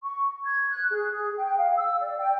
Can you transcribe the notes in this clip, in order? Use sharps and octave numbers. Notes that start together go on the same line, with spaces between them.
C#6
G#6
F#6
G#4
G5
F5
E6
D5
G5